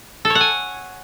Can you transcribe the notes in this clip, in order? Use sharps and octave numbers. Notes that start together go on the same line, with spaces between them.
A4
C#5
F#5
G#5